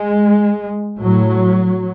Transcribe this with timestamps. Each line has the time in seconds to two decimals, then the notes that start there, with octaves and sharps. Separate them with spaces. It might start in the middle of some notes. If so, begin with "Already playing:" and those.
Already playing: G#3
1.00 A2 F#3